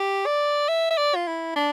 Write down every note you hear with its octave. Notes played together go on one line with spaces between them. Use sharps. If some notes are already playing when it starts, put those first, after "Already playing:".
Already playing: G4
D5
E5
E5
D5
F4
E4
D4